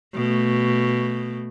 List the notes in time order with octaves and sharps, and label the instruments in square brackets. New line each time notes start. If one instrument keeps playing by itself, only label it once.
[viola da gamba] B2 A3